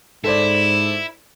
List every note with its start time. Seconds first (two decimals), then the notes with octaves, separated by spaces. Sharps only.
0.24 G#2 E4 A4 C5 D5